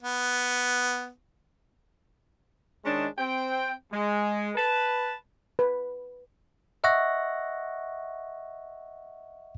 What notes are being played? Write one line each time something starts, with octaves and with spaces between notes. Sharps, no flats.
B3
D#3 G#3 C#4 D4 D#5 A5
C4 G5
G#3
B4 A5
B4
D#5 E5 F#5 C#6 F#6 A#6